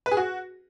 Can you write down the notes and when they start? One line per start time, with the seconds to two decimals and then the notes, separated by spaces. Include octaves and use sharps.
0.06 B4
0.11 G#4
0.17 F#4